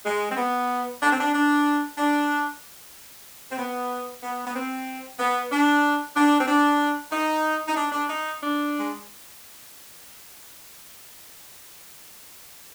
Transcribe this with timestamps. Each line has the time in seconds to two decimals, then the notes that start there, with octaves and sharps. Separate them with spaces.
0.05 G#3
0.30 C4
0.37 B3
1.02 D4
1.11 C4
1.19 D4
1.34 D4
1.98 D4
3.51 C4
3.58 B3
4.23 B3
4.46 B3
4.55 C4
5.19 B3
5.52 D4
6.15 D4
6.39 C4
6.47 D4
7.11 D#4
7.68 D#4
7.76 D4
7.92 D4
8.08 D#4
8.41 D4
8.80 G#3